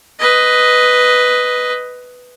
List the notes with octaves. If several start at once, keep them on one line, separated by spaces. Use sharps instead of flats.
B4 D#5